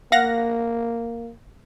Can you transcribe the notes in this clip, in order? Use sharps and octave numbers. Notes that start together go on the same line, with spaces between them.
A#3 F5 F#5 A#6